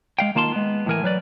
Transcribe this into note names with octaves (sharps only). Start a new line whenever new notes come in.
G#3 F5 G5
D#3 A#3 F4 A5 C6
G#3 B3
A2 E3 A#4 G#5
F#3 B4 D5